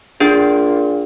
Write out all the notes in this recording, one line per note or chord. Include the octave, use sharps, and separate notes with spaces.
A#2 D4 G#4